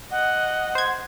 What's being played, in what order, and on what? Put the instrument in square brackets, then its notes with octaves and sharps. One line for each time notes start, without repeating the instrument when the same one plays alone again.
[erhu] D#5 [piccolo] F#5
[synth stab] C5 G#6